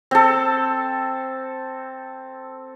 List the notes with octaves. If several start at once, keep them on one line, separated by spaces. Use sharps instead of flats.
C4 A4